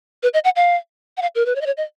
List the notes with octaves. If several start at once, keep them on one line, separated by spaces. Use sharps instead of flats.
B4
D#5
F#5
F5
F#5
F5
A#4
B4
C#5
D#5
C#5
D#5